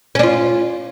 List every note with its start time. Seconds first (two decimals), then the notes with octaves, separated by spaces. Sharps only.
0.15 C#4
0.19 D4
0.23 F4